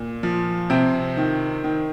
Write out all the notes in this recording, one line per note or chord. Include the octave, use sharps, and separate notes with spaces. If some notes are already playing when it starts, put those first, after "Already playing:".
Already playing: A#2
F3
C3 C4
D#3
D#3